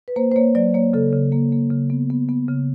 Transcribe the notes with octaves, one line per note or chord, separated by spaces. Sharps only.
B4
A#3 C5
C5
A#3 C#5
F#3 D5
A#3 C#5
C#3 A4
C#3
A#3
A#3
C#3
B3
B3
B3
C#3